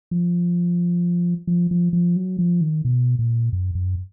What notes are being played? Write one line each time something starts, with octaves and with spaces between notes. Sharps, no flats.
F3
F3
F3
F3
F#3
F3
D#3
B2
A#2
F#2
F#2